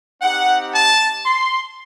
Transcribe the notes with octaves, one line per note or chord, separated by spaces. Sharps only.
C4 D#4 G4 F#5
A5
C6